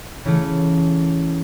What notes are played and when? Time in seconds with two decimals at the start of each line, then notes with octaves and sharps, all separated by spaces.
0.24 C#3 E3 A3